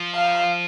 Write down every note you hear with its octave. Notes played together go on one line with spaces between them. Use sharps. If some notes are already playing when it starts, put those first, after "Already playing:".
Already playing: F3
F5